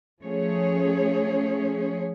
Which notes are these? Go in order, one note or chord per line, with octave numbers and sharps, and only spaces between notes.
F3 A3 C#4 G#4 C#5